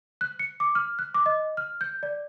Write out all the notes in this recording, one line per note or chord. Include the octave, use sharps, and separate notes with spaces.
F#6
C#7
D6
F6
F#6
D6
D#5
F6
G6
D5